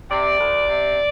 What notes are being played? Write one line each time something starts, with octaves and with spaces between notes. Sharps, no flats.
C3 D5
D2
C3